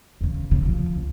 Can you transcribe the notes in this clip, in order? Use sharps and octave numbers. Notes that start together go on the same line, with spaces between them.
E2 C#3
C#3
F3
C#2